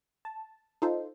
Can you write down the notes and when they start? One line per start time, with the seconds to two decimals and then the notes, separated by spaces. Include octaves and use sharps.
0.25 A5
0.82 D#4 F4 A4 C5